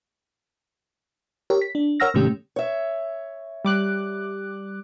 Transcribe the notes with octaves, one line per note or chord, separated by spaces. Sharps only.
G4 A#4 C#5
B6
D4
A#4 C#5 F#5 E6 F6 A#6
G#2 C3 D#3 A3 C#4 G4
C#5 E5
G3 D6 F#6